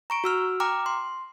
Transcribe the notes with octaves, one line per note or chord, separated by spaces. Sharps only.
A#5 C#6 D7
F#4 E6 F6
G5 A#5 D6 F6
C6